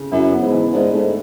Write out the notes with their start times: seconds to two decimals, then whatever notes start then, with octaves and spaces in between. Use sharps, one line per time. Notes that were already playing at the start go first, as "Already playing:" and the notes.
Already playing: C#3
0.12 F#2 E4
0.32 B3
0.42 G#2
0.52 E3
0.73 G#2 D4
0.93 G#2 A3